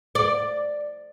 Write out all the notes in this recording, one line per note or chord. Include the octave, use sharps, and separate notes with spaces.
D5